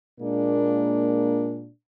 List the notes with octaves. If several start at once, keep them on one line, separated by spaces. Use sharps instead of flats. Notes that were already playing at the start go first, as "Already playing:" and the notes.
A#2 G#3 A#3 D4